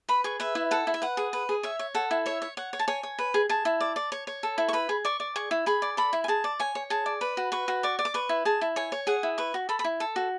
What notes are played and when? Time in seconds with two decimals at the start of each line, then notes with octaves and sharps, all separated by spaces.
0.09 B4 B5
0.24 G#4 C#6
0.40 B4 E5
0.55 E4
0.71 A4 F#5
0.87 E4
0.94 E5
1.02 B4 F#5
1.17 G#4
1.33 B4
1.49 G#4
1.63 C#5 E5
1.79 C#5
1.95 A4 F#5
2.11 E4
2.26 C#5 E5
2.42 C#5
2.57 C#5 F#5
2.73 C#5
2.79 A5
2.88 C#5 G#5
3.03 C#5
3.19 B4
3.34 G#4
3.49 G#4 A5
3.65 E4
3.81 D5
3.96 D5
4.12 C#5
4.27 C#5
4.43 A4
4.58 E4
4.69 C#6
4.73 B4 B5
4.89 G#4
5.05 D5 C#6
5.20 D5
5.36 G#4 C#6
5.51 E4
5.66 G#4 B5
5.82 D5
5.97 A4 B5
6.13 E4
6.24 G#5
6.28 G#4 A5
6.44 D5
6.60 C#5 G#5
6.75 C#5
6.90 G#4 A5
7.06 D5
7.21 B4 B5
7.37 F#4
7.52 B4 C#6
7.68 F#4
7.83 D5 C#6
7.99 D5
8.05 D6
8.14 B4 C#6
8.29 E4
8.45 G#4 A5
8.61 E4
8.76 C#5 G#5
8.92 C#5
9.07 G#4 F#5
9.23 E4
9.38 B4 C#6
9.54 F#4
9.69 A4 B5
9.79 B5
9.84 E4
10.00 A4
10.16 F#4